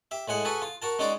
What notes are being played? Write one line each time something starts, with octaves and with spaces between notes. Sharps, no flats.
G4 E5
A2 G#3 G#4 F#5
F#4 G#4 A4 B4
F4
F#4 A#4 A5
G#3 C#4 D#4 F#4 C5 D5